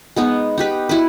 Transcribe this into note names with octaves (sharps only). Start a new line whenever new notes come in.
G#3 B3 D#4
D#4 G4 B4
E4 F#4 B4